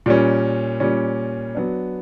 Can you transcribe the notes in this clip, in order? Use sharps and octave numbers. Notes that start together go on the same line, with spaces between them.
A#2 G3 C#4
A#2 G3 C#4
F#3 B3 D4